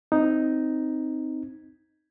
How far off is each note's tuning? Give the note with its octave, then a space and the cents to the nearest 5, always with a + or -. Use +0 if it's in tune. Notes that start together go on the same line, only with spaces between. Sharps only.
C4 +0 D#4 +0